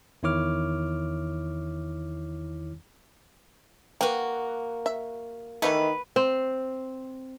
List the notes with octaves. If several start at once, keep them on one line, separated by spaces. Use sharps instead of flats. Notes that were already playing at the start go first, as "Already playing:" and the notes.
E2 D#3 E4 C#5 D6 F6
A#3 F#4 B4 G5
E5
D#3 E3 F#3 A3 B4
C4